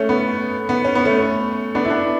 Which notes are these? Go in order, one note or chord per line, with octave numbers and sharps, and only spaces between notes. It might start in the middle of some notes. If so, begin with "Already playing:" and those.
Already playing: A3 C#4
B3
B3
C#4
B3
A3 C#4
B3 D4
E4
B3 D4